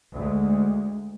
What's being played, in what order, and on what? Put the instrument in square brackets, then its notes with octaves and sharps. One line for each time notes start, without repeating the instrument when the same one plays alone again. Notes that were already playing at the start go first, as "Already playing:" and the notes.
[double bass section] D2 G#3